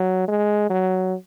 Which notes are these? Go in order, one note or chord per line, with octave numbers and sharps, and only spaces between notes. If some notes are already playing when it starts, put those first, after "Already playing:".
Already playing: F#3
G#3
F#3